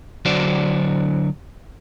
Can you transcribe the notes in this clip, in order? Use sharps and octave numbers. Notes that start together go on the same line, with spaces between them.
D3 F#3 D4 F#4 C5 D5